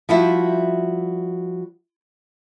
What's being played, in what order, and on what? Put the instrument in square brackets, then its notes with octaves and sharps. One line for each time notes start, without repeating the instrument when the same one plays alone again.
[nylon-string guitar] F3 G3 E4 F#4 E5